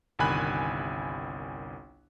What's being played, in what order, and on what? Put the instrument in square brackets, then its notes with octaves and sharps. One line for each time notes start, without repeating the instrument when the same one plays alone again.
[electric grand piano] G1 C2 D#3 G#5 B5 F#6